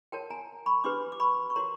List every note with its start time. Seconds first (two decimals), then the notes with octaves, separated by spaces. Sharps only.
0.12 F#4 A#4 C#5 G5 A5
0.30 G#5 A#5
0.66 B5 C#6
0.84 D4 G4 B4 C6 D6
1.12 D6
1.20 B5 C#6
1.50 C#6
1.56 F#4 A#4 C#5 A#5 C6